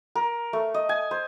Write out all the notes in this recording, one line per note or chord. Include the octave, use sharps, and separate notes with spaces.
A#4
A3
D#5
G#5
C5